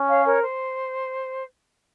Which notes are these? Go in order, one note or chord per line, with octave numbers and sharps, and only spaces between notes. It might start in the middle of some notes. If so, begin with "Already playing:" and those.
Already playing: C#4
C#5 F5
A#4 C#5
C5